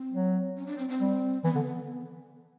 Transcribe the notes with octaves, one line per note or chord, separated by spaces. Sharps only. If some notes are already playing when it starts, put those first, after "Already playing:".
Already playing: C4
F#3
C#4
D4
C4
C4
G3
E3 B3
D3